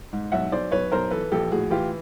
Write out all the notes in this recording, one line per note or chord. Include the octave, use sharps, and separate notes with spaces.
G#2
B1 E5 F#5
B1 C5 D5
B1 B4 C#5
B1 A#4 C5
E3 A4 B4
A#1 G4 A4
A2 F#4 G#4
E3 F4 G4